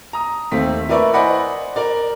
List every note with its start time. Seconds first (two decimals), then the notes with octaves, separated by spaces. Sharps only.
0.13 A#5 D#6
0.52 D#2 A3 C4 B6
0.89 E4 A#4 B4 D5 E5 C#6
1.14 C5 D5 D#5 F#5 G#5 B5
1.76 A#4 D5